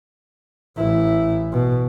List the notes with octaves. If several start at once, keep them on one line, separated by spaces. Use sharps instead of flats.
A1 E4
B2